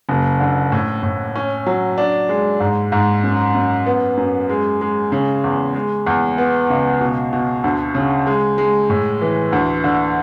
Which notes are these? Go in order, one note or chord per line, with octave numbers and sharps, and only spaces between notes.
F#1
D3
A2
A2
C#4
F#3
D4
G#3
G#2
G#2
F#2
F#2
B3
F#2
G#3
G#3
C#3
E2
G#3
E2
B3
C#2
B2
B2
D2
C#3
G#3
G#3
A2
E3
D2
D3